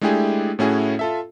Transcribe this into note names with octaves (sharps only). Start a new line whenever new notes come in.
G#3 A3 D4 E4 G4 G#4
A2 A3 C#4 E4 F#4 G#4
F4 A4 E5